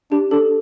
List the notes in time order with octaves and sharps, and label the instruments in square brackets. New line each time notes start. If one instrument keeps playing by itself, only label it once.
[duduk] D4 [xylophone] G4
[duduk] D4 [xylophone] A4